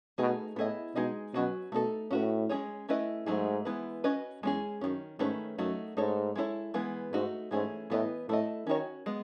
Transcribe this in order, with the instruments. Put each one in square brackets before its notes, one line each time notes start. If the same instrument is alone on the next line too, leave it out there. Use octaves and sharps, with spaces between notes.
[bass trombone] B2 [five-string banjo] A3 D#4 G#4
[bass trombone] A2 [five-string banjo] B3 E4 G#4 D#5
[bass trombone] B2 [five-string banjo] G#3 D#4 G#4 D#5
[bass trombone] B2 [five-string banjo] F#3 C#4 F#4 B4
[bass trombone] B2 [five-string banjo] A3 D#4 A4
[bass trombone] A2 [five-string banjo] C#4 F#4 B4
[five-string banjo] G#3 C#4 G#4 C#5
A3 C#4 E4 B4 D#5
[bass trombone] G#2 [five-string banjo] F#3 A3 D#4 G#4
[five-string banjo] E3 G#3 B3 E4 B4
C#4 F#4 B4 D#5
[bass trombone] E2 [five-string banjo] G#3 C#4 G#4
[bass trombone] F#2 [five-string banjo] D#3 F#3 C#4
[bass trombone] G#2 [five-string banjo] D#3 A3 C#4 G#4 B4
[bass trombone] F#2 [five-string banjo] F#3 A3 D#4 F#4
[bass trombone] G#2 [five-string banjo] A3 D#4 A4 C#5
[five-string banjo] G#3 B3 E4 A4 C#5
E3 G#3 B3 B4
[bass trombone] G#2 [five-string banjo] A3 D#4 F#4
[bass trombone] G#2 [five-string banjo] E3 A3 C#4 G#4
[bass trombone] A2 [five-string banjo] E3 B3 F#4 B4 D#5
[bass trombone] A2 [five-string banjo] A3 E4 A4 D#5
[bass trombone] D#3 [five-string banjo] C#4 F#4 C#5
[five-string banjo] G#3 B3